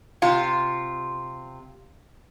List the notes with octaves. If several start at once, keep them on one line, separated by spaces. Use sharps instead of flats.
C3 F4